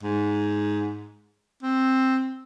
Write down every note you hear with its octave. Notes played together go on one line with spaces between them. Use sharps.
G#2
C4